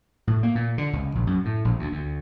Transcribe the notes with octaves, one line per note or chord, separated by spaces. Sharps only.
A2
A#3
A#2
D3
C#2
A#1
F#2
A2
A#1
D2
D2